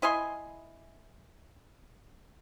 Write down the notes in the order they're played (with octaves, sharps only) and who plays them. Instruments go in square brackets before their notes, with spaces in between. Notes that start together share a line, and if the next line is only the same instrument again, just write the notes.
[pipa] E4 D#5 G#5 C6